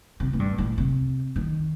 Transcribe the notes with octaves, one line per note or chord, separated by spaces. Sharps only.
C3
A2
G2
A2
C3
D#3